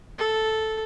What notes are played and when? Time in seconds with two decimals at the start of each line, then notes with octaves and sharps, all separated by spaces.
0.19 A4